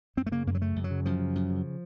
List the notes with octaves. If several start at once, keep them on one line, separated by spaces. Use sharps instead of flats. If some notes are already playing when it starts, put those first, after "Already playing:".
F#2 C4
A3
C#3 A#3
F#2 A#3
F#3
C#3 A3
F#2
F#3
C#3
F#2 F3
C#3
F#2
C#3